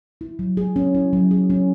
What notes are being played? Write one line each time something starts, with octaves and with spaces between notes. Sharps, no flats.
E4
F#3
G#4
C#4
E4
F#3
G#4
C#4